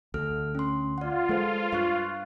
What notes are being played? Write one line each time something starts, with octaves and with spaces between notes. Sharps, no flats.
D2 A4 F6
C#4 C6
F4 D5 F#5
G#3 A4 B4 C5
G2 F5 C#6 F#6